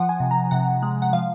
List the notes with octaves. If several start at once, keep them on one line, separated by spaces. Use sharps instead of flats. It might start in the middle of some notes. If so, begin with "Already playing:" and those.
Already playing: F3 F#5
G#5
C3
A#5
C3 F#5
G#3
F#5
F3 F5